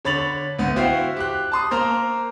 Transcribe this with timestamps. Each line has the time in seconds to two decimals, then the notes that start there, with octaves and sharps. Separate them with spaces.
0.05 D3 C#5 B5 A6 F7 F#7
0.59 D2 B3
0.76 E4 F#4 C5 E5 F5 G5
1.17 G4 F#6
1.52 A5 C6 D#6
1.71 A#3 C5 A#5 F6